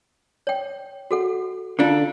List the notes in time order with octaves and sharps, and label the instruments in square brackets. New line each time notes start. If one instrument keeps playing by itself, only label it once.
[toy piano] C#5 G5
F#4 A4 F#5
[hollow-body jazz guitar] D3 D4 A4 [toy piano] F4 F5 A#5